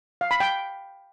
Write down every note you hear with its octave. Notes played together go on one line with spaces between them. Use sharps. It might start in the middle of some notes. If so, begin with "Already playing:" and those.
F5
B5
G5